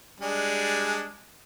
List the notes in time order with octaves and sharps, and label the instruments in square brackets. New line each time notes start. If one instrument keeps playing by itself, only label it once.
[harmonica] G3 G#3 D4